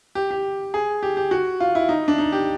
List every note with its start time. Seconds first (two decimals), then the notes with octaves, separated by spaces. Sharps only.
0.15 G4
0.31 G4
0.74 G#4
1.03 G4
1.17 G4
1.31 F#4
1.60 F4
1.75 E4
1.89 D#4
2.08 D4
2.18 D#4
2.32 G4